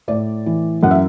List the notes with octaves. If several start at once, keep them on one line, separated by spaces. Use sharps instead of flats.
A2 D5
E3
F#2 F#5
E5